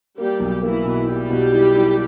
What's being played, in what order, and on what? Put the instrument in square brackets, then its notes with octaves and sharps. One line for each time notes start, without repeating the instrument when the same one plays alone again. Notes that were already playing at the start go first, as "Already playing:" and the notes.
[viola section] G3 G4 [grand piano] A#3
[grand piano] B1
[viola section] E3 E4 [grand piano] A#3
[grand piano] B2
[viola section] G3 G4 [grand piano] E4
[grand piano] B2
E4
E4